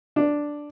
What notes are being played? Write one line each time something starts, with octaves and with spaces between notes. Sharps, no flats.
D4